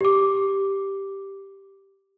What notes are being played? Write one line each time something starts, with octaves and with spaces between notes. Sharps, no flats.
G4 D6